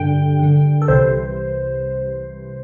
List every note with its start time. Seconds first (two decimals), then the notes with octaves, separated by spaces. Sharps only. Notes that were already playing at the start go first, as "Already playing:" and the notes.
Already playing: G2 D3 G5
0.39 G2 D3
0.82 A4
0.88 C2 C3 E3 C5